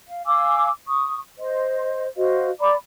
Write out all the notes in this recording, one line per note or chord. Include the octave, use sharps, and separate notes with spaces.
F5
F5 G#5 D6 E6
C#6 D#6
C5 D#5
F#4 C5 D#5 F5
D5 A#5 B5 D6